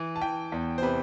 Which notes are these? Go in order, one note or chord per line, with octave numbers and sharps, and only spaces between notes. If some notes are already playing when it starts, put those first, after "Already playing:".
Already playing: E3
A5
E3 G5
E2
C5
C3 B4